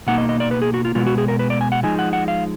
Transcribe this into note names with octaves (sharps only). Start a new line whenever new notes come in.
B2 A#3 D#4 F#5
D#5
D#5
D5
B4
G#4
F#4
F4
B2 G#3 B3 F4
F#4
G#4
A#4
B4
D5
G#5
F#5
F3 G#3 D#4 G#5
F#5
F#5
F5